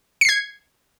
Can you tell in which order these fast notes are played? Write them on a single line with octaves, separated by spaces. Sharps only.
C#7 C7 G#6